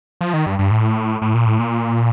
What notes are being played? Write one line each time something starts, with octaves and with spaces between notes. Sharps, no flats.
F3
D#3
G2
G2
A2
A2
A#2
A2
A#2